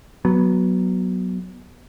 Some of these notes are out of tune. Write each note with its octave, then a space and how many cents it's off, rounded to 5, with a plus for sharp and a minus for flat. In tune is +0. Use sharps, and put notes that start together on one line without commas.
F#3 +5 B3 -15